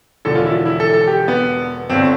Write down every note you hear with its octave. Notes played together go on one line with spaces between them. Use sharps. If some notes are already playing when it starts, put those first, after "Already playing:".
E1 E2 D3 F3 A4
F4
E4
E4
A4
A4
G4
B3
G1 G2 D3 C4